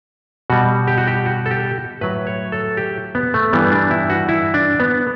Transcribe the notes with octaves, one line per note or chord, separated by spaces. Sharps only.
B2 G3 F#4
G4
F#4
G4
F#4
A4
G4
A2 F#3 B4
C#5
A4
G4
B3
A3
G2 E3 G3 B3
D4
E4
F#4
E4
D4
B3